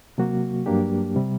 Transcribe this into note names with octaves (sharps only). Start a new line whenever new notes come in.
C3 F#3 A#3 F#4
G2 F#3 A#3 D4 G4
C3 G3